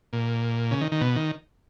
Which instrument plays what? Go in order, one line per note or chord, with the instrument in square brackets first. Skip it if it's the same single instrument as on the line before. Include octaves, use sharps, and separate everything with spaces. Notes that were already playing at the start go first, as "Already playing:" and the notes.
[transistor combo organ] A#2
C#3
D#3
D#3
B2
D#3